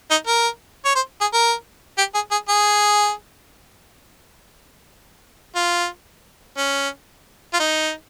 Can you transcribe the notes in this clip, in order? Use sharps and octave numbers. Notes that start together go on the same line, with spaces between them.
D#4
A#4
C#5
C5
G#4
A#4
G4
G#4
G#4
G#4
F4
C#4
F4
D#4